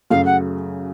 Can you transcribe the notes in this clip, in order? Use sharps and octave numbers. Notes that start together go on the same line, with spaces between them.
F#2 C#3 F#3 A3 F5
F#5